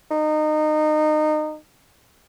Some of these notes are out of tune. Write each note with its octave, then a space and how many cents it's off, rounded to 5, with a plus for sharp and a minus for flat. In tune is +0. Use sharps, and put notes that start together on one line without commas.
D#4 -25